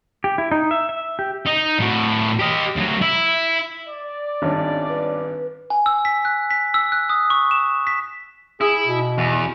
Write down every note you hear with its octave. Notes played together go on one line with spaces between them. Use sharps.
G4
E4
D#4
E5
E5
G4
D#4
A2 F#4
G4 D#5
D2 F#3
E4
D5
G#1 G2 C#4
B4
G#5
E6
B6
F#6
B6
E6
F#6
D#6
C#6
E7
B6
E4 G#4
B2
E2